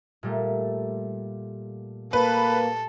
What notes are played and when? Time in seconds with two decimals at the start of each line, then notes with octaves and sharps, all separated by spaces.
0.23 A#2 G3 A3
2.13 A#3 A4 B4